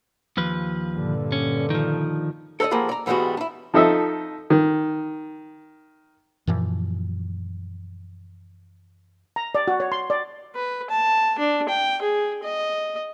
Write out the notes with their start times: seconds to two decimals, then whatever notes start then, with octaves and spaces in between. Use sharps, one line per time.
0.37 D#2 F3 B4
0.95 G2 A#2 D3
1.32 C#4
1.70 D#3 F3
2.60 A4 A#4 C5 D5 D#5
2.71 D#2 F3 A#3 G#4 F#5 B5
2.89 D5 A#5
3.06 G#2 E3 G3 G#3 B3 F#4
3.37 D4 E4
3.74 F3 D#4 A4 D#5 E5
4.50 D#3
6.47 F#2 A#2 E3 F3
9.36 A#5
9.55 D5
9.68 F#4
9.80 C#5
9.92 C6
10.10 D5
10.56 B4
10.90 A5
11.39 D4
11.69 G5
12.02 G#4
12.43 D#5